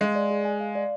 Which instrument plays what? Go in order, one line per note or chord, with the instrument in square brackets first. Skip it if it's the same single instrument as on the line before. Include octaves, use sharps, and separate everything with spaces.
[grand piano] G#3 [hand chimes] F5
[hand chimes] D5
G#4
G#5
F5
D5